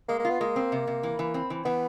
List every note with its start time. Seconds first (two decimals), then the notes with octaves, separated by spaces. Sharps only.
0.09 G#3 A#3
0.19 A#3
0.25 B3 F4
0.40 G#3 A#3
0.56 C4
0.72 C3
0.87 C3
1.03 E3
1.19 E3
1.34 C4
1.50 E3
1.65 E3 B3